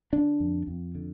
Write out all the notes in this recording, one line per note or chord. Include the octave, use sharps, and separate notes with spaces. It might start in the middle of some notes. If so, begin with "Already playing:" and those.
D3 D4
F2
F2
D3